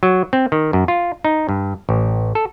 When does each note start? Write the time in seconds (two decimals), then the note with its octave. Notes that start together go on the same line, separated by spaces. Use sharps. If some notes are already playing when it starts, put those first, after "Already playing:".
0.03 F#3
0.33 C4
0.52 D#3
0.73 F#2
0.88 F4
1.25 D#4
1.49 G2
1.89 A1
2.35 A4